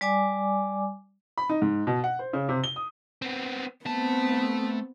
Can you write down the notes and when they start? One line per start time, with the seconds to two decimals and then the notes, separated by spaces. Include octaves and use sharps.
0.01 G3 D5 G#5 D6
1.38 B5
1.49 D#4
1.62 G#2
1.87 B2
2.04 F#5
2.19 C5
2.33 C#3
2.49 C3
2.64 G7
2.76 D#6
3.22 B3 C4
3.86 A3 B3 C4 A5